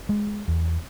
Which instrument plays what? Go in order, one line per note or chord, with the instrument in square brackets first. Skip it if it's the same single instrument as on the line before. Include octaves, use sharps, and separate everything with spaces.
[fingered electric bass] G#3
E2